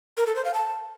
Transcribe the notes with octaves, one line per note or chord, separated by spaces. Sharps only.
A#4
A4
C5
F5
A5